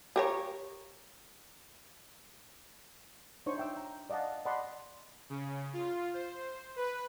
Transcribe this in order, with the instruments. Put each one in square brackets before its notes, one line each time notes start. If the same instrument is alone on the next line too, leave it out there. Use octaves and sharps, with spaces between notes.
[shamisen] G4 A#4 C#5
[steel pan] D4 D#4 C5 C#5 C#6
E5 G5 E6
A#5
D5 D#5 F5 F#5 A5
D5 D#5 F#5 A5 B5 C6
[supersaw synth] C#3
F4
C5
B4